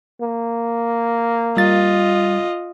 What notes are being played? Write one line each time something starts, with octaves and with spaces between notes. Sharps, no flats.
A#3
G3 F4 D#5 A6